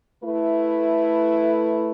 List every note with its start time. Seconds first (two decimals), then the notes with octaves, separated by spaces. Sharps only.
0.23 A3 E4 B4